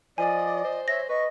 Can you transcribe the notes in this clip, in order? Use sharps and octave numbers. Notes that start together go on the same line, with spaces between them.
F3 D5 D#5 G#5
C5
C#5 E5 A#6
B4 D#5 C#6